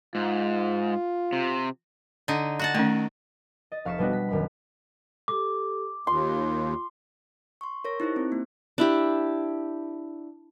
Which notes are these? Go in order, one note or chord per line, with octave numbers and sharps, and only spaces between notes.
G#2 F4
C3
D3 D#4
F#4 F#5 A5
D#3 A3 C#4
D#5 A6
F1 F5 C#6 B6 C#7 E7
B2 G3 B3 D4 F#4
B6
D#1 F#2 B5
G4 A4 D6
D#2 F4 C6
C6 C#6
A#4 C#5 C#6 A#6
D#4 E4 G4 C5
C4
A#3
D4 E4 G4